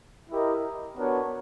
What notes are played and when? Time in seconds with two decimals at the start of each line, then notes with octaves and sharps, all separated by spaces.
0.30 E4 G4 A#4 D#5
0.97 B3 D4 F#4 A#4 C#5